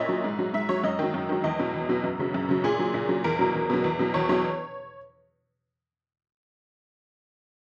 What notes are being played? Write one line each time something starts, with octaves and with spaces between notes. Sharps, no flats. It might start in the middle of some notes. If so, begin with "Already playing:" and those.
Already playing: A#2 C#5 D#5 E5
F#3
G#2
F#3
G#2 E5
F#3 C#5
F#2 D#5
D#3 F#3
F#2
D#3 F#3
E2 D#5
B2 F#3
E2
B2 F#3
F#2
C#3 F#3
F#2
C#3 F#3
A#2 G#4
F#3
A#2
F#3
E2 A#4
B2 F#3
E2
B2 F#3
E2
B2 F#3
E2 C#5
B2 F#3 C#5